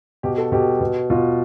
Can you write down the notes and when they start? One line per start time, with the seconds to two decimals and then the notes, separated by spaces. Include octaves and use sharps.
0.23 B2 G4
0.38 A4
0.52 B2 G4
0.81 B2
1.10 B2 F4